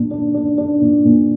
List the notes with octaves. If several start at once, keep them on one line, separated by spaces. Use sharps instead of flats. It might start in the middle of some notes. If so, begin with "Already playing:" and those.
Already playing: A#2 A#3 D4
D4
D4
D4
A#2
A#2